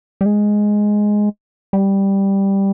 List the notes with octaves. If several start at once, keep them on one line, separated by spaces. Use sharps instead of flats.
G3
G#3
G3